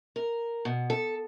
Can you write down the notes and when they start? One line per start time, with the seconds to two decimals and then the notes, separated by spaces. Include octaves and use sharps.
0.16 A#4
0.65 B2
0.90 A4